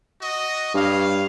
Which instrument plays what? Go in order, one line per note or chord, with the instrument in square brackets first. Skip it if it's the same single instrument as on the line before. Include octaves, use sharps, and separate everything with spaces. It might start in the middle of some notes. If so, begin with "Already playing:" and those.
[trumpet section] F#4 D#5
[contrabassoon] G2 [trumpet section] C#5 F5